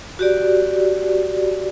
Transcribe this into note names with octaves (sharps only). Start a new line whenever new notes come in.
F#4 G4 D5